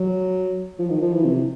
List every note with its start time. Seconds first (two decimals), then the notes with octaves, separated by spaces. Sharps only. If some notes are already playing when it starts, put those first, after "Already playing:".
Already playing: F#3
0.79 F3
0.90 D#3
1.02 F3
1.13 E3
1.25 C3